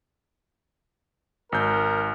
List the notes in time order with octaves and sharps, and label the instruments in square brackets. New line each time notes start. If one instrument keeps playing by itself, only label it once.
[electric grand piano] G#1 G6 [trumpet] A#4